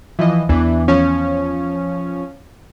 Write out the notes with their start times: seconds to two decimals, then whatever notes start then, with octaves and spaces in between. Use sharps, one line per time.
0.19 E3 F3 D#5
0.49 E2 E3 D4
0.88 F3 C#4